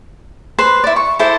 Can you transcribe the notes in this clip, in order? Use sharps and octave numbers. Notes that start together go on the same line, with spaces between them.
B4 C5 B5 C6
E4 D5
C#6
E4 A4 C5 D5